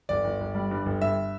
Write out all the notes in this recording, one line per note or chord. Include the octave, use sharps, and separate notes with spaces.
G1 D5
G1
G1
G3
G2
G1
G2 E5